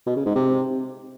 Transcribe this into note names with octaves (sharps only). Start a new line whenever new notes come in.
B2
C#3
G#2
C3